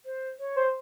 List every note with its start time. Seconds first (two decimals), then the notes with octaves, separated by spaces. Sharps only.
0.05 C5
0.39 C#5
0.56 C5